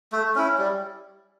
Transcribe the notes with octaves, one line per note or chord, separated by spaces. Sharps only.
A3
C#4 E4
G3